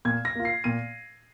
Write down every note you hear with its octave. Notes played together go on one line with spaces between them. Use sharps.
A#2 G#6
A#6
A#3 F4
C7
A#2 D#7